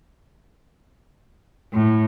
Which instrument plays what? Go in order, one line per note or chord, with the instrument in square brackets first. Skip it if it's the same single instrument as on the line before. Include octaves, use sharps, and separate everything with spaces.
[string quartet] A2